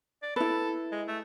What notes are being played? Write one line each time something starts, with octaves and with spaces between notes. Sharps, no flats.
D5
E4 A4 B4
G#3
A3